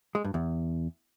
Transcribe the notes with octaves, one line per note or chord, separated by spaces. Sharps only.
G#3
G2
E2